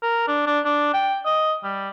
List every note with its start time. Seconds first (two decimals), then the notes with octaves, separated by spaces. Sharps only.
0.02 A#4
0.28 D4
0.47 D4
0.65 D4
0.94 G5
1.26 D#5
1.64 G3